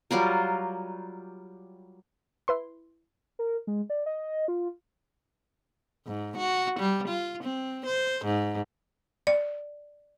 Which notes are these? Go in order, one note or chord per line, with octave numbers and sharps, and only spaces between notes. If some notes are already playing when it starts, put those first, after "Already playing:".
F#3 G3 F4 A#4
E4 B4 C6
A#4
G#3
D5
D#5
F4
G#2
F#4
G3
F4
C4
C5
G#2
D5